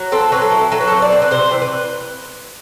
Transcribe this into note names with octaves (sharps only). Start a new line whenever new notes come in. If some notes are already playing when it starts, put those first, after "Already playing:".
Already playing: F#3
C4 A4
F#3 B4
A4
E4
F#3 A4
B4
C4 A4
D5
C4
B4
C3 C5
E3
B4